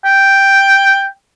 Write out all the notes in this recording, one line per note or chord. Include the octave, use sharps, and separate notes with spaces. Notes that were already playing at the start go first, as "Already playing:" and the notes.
G5